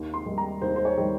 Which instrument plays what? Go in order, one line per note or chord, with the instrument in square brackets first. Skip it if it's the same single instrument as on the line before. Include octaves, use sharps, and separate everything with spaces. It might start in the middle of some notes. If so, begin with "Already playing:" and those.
Already playing: [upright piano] D#2
C6
D#3 G3
A#5
D#2 C5
C5
C#5
D#3 G3